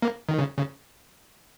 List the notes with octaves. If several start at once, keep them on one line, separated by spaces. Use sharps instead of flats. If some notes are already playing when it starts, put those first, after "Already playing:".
A#3
D#3
C#3
C#3